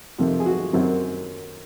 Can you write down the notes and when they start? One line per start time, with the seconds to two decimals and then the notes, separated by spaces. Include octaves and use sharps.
0.19 F2 C3 D#3
0.40 G#4
0.46 F#4
0.73 F#2 D#3 F#3 C4